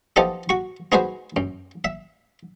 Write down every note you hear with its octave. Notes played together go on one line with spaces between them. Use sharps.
F3 B3 D#4 G4 A4 D#5
F#4 C#6
B3 D#4 F#4 G#4 B4 C5
F#2
E5